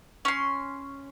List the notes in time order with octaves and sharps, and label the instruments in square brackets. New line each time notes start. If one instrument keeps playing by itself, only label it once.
[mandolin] C#4 C6